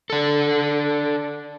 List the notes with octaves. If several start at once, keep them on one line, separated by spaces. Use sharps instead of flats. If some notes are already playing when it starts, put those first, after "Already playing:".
D4 A4